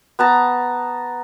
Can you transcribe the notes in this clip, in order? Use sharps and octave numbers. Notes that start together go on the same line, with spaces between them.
B3 A5 A#5